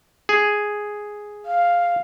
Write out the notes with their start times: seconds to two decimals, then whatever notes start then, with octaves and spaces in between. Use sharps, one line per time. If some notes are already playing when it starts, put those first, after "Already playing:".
0.29 G#4
1.46 F5